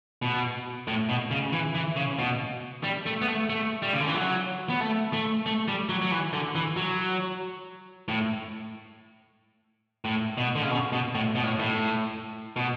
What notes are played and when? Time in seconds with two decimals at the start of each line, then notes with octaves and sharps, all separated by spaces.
0.22 B2
0.88 A2
1.09 B2
1.31 C#3
1.53 E3
1.75 E3
1.96 C#3
2.19 B2
2.84 G3
3.06 A3
3.22 B3
3.28 A3
3.50 A3
3.82 G3
3.93 C#3
4.00 D3
4.07 E3
4.15 F#3
4.70 B3
4.80 A3
5.13 A3
5.46 A3
5.68 G3
5.89 F#3
6.02 F#3
6.11 E3
6.33 D3
6.55 E3
6.77 F#3
8.08 A2
10.05 A2
10.38 B2
10.55 D3
10.63 C#3
10.71 B2
10.92 B2
11.15 A2
11.35 B2
11.43 A2
11.59 A2
12.56 B2